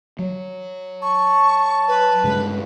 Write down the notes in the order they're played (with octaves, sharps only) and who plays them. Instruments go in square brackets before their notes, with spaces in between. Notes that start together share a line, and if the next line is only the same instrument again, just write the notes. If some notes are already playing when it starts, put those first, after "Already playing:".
[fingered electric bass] F#3
[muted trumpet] A5 [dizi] C#6
[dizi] B4
[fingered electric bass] G2 C#3 G#3